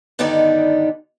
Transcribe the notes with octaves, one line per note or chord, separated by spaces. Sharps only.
G2 D3 D#3 B3 D#4 D5